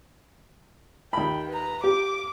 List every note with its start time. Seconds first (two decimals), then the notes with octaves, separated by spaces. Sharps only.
1.13 D#2 G5 B5
1.49 B4 A#5
1.84 G4 D6